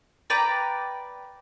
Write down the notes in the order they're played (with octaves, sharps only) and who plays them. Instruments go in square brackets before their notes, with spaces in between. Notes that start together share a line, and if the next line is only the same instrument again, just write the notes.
[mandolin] B4 D5 G5 A#5